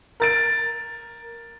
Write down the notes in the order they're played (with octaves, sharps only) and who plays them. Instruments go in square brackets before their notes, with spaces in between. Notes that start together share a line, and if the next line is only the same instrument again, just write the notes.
[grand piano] A#4 A6 D7